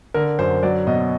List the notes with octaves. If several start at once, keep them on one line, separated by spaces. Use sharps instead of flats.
D3 A#4
F#2 C5
F#3 D5
B2 D#5